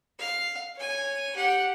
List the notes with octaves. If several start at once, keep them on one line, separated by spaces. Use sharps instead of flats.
F5
C#5 G#5
G4 F#5